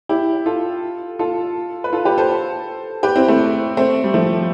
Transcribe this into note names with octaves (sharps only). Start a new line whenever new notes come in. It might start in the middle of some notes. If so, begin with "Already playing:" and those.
E4 G4
F4 A4
F4 A4
B4
F4 A4
G4 B4
A4 C5
G4 B4
C4 E4
A3 C4
A3 C4
G3
F3 A3